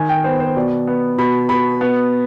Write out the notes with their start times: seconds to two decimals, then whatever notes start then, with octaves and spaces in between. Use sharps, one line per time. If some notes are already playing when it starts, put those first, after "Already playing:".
Already playing: D#3 G#5
0.09 G5
0.24 B3 C5
0.40 C5
0.56 B2 D5
0.87 B3
1.18 B2 B5
1.49 B2 B5
1.81 B3